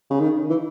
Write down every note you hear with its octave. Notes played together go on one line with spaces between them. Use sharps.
C#3
D#3
E3